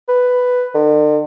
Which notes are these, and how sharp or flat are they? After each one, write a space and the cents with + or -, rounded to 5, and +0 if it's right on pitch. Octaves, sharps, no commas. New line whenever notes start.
B4 +5
D3 +45